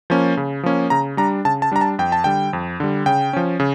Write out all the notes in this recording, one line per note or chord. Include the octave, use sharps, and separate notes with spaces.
F3 A#3 C#4
C#3
F3 A#3 C#4
C#3 A#5
G3 D4 A#5
C#3 A5
A5
G3 D4 A#5
A5
F2 G5
A5
D3 G3 G5
F2
D3 G3
C#3 G5
F3 C#4
C#3